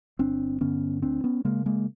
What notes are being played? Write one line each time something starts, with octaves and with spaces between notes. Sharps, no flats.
G1 C4 D4
G2 D3 B3 C#4
D2 C4 D4
B3 C#4
C#3 G#3 A#3
G#3 A#3